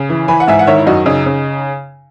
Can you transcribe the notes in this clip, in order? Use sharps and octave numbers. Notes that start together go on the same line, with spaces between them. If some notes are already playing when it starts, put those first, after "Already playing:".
Already playing: C#3
E3
E3 G#5 B5
F#5
G#2 E5 G#5
F#5
D#3 C#5 E5
E4
F#2 D#4 F#4
C#3 D#4
C#3